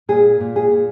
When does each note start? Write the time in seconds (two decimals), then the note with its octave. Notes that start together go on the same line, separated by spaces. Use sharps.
0.09 A#2 G#4
0.40 A#2
0.56 G#4
0.72 A#2